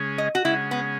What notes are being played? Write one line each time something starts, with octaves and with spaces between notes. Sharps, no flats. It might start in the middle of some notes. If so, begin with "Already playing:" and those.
Already playing: C#3 G#3 C#4 G#4
D#5
F#4
C#3 G#3 C#4 E4 G#4
B3